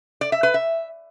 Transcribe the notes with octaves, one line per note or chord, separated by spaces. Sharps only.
D5
E5
B4
E5